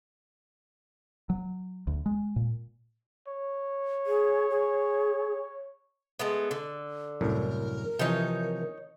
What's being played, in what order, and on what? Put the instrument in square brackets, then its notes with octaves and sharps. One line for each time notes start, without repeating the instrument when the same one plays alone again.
[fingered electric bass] F#3
D2
G#3
A#2
[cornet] C#5
[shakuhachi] G#4
G#4
[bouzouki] G#3 A3 B3
D3
[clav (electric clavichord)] C2 F#2 A2 [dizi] A#4
[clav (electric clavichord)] C3 E3 F3 [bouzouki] D#4 C#5